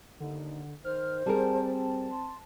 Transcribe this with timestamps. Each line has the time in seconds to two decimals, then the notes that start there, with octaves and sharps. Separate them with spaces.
0.20 D#2 D3 D#4
0.85 D#3 C5 F6
1.26 G3 C4 G#4 A#4 A5
2.11 C6